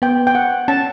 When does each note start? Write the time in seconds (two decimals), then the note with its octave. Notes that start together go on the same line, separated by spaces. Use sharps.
0.02 B3 G5
0.27 G5
0.35 F#5
0.68 C#4 A5